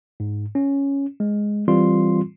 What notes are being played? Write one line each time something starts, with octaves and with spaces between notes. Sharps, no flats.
G#2
C#4
G#3
E3 G3 C4 F4 C6